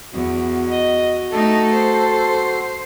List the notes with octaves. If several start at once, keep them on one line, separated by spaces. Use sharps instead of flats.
E2 F#4
D#5
A3 D#4 A4
C5